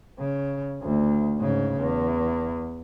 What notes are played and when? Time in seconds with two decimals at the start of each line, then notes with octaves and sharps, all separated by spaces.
0.19 C#3
0.82 D2
1.39 G#2 C#3
1.79 E2